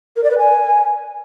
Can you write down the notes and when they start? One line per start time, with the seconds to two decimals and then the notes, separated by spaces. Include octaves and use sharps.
0.16 A#4
0.24 D5
0.31 B4
0.38 G#5